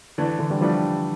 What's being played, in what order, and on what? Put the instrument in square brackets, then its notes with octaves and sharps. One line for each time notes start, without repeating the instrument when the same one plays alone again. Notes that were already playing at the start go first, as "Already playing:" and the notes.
[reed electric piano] D3 [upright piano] E3 A3 D4
[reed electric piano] D3 E3
G3 A3
[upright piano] E3 A3 D4 [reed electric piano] F3 G3